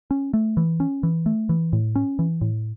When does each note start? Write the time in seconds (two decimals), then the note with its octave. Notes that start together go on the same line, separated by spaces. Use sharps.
0.11 C#4
0.34 A3
0.57 E3
0.80 C#4
1.03 E3
1.26 A3
1.49 E3
1.73 A2
1.95 C#4
2.19 E3
2.41 A2